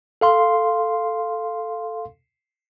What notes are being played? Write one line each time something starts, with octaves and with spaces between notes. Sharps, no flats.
A4 F5 C6